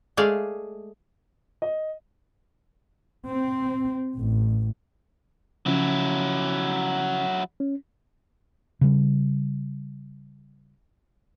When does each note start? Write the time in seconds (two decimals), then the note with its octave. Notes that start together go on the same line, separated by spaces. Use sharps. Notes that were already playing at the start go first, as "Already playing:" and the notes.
0.17 G#3 A3 G#4 D5 F5
1.62 D#5
3.28 C4
4.19 A1
5.66 C#3 F3 F#3 C#4 E4
7.60 C#4
8.81 C#3 G3